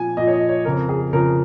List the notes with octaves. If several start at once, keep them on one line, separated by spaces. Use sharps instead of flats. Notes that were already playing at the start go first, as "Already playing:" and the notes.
Already playing: A#2 F3 G#5
A#2 F3 D#5
C#5
D#5
C#5
F2 C#3 F3 A#4
G#4
F2 C#3 F3 A#4